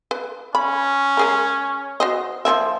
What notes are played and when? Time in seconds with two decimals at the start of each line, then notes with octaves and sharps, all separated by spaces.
0.11 B4
0.55 C#4 B5
1.17 G#3 G#4 A#4
2.00 F#4 C5 D#5
2.45 F3 A#3 E5